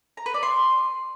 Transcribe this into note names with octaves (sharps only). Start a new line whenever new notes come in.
A#5
B4
D5
C6